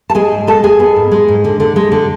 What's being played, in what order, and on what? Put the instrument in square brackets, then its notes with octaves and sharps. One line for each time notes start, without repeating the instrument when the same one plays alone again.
[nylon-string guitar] A5
G#3 G#4 G#5
G#2
G#3 A4 A5
G#3 G#4 G#5
B3
G#2
G#3
G#2
D3
D3
G#3
D3